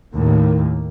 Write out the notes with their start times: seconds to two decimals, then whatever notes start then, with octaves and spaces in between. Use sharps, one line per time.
0.14 D#2 A2 D#3 A#3